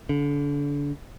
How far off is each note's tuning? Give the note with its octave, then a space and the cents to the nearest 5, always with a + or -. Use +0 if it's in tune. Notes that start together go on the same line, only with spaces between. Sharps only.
D3 -35